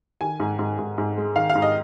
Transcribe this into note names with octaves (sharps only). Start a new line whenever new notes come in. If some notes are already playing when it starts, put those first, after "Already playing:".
D#3 G#5
G#2
G#2
G#2
G#2
G#3
D#3 F5
F5
G#2
D#5